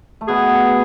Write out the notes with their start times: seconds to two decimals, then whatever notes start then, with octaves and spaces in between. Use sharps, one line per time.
0.21 A3
0.28 B2 B3 G#4